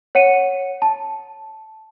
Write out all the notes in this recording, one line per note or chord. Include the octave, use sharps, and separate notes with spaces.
C#5 F#5 C#7 D#7
A5